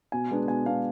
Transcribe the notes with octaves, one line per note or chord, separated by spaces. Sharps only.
B2 G#5
G#3 B3 D4
B2 G#5
G#3 B3 D4 F5